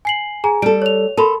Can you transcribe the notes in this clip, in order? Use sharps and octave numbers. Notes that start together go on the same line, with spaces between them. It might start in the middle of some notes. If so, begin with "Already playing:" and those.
G#5 C7 F#7
G#4 G#5 A#5
G3 A4 D7
C#5 F7
A4 A#4 B5 C6